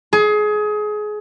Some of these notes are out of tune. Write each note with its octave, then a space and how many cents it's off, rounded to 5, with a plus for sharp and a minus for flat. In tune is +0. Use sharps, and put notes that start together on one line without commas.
G#4 +25